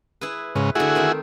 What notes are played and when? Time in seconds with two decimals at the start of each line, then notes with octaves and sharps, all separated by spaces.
0.21 E4 G#4 B4
0.55 G#2 C#3 B4
0.75 D3 A3 E4 F#4 G#4
0.95 D#3 C4 D#4